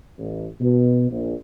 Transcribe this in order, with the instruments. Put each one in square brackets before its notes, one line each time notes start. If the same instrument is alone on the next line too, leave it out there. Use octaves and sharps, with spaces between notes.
[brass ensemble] A1
B2
A#1